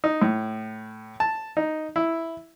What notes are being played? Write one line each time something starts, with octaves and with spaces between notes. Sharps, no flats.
D#4
A2
A5
D#4
E4